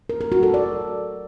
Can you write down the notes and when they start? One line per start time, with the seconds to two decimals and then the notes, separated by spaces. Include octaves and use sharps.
0.10 A#4
0.21 A#4
0.32 F#4
0.43 A4
0.54 D5